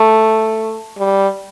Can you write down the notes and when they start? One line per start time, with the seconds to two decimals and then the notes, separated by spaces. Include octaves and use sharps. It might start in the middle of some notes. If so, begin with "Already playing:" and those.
Already playing: A3
0.98 G3